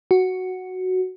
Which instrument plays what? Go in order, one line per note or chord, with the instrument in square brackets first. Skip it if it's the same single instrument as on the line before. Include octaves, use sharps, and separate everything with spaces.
[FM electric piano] F#4